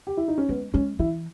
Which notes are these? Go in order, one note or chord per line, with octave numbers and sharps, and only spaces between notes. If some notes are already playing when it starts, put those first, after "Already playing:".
G4
E4
D#4
C#4
G#3 B3
G#3 C#4
E3 E4